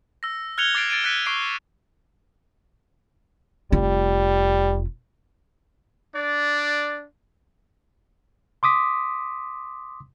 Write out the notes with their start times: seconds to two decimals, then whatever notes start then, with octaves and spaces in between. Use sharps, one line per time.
0.23 E6 A#6
0.58 F6 F#6 G#6 C#7 F7 G7
0.75 D6 A6 C7 D7
0.90 A6 D7 D#7
1.04 F#6 G#6 A6 B6 C#7 D#7
1.26 C#6 D6 C7 D7 G7
3.72 F1 G3 F4
6.15 D4 D5
8.63 C6 D6 D#6 B6